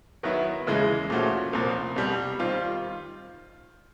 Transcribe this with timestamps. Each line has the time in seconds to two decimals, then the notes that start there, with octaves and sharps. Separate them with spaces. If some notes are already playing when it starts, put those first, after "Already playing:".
0.23 D#3 F#3 B3 E4
0.67 D#2 C#3 E3 G#3
1.10 A#2 F3 A3 C#4 F#4
1.53 C2 A#2 F3
1.96 C2 B2 G3
2.39 D#3 G3 C4 F4